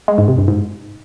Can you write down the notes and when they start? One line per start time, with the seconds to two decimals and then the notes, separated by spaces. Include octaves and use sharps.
0.08 G#3
0.18 G#2
0.28 C3
0.38 G2
0.48 G#2